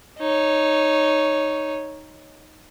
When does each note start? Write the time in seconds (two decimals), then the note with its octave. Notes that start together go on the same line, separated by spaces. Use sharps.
0.19 D#4 C#5